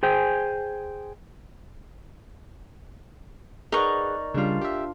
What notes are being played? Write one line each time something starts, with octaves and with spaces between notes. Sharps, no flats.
G#4 C5 G5 G#5
D#4 G#4 A#4 B4 D5 F#5 C#6
C#3 G3 D4 F4
G4 E5